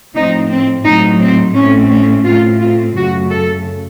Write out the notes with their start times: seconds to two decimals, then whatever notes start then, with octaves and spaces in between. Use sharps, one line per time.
0.14 A2 F3 C4 D#4
0.50 C4
0.85 A2 F#3 C4 D#4
1.20 C4
1.55 A2 A3 C4 C#4
1.90 C#4
2.25 A2 A3 C4 F4
2.60 F4
2.95 F#2 C#3 A3 F#4
3.30 A4